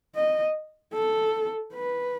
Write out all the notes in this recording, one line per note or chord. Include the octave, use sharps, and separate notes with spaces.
D#5
A4
B4